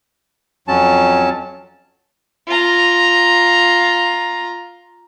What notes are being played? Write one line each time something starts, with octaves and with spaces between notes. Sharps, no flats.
F2 F#3 C#4 A5
F4 A#5